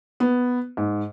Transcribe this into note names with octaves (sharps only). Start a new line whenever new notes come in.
B3
G#2